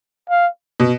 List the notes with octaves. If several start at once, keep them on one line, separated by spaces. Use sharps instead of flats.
F5
B2